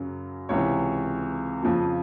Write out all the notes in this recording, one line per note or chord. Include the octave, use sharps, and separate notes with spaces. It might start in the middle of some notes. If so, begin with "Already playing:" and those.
Already playing: F#2 C#3 F#3
C#2 C3 E3 C#5
F2 C#3 F3